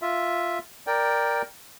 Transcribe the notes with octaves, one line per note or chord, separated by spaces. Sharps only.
F4 E5
A#4 D5 G5